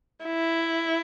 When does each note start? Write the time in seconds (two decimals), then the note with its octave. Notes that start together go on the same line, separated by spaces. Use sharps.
0.25 E4